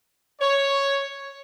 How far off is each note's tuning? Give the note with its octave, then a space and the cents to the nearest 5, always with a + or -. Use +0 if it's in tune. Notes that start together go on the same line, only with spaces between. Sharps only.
C#5 +0